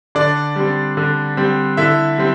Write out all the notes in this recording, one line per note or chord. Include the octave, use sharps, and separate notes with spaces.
D3 D4 D5
G3 C4
D3
G3 C4
D3 E4 E5
G3 C4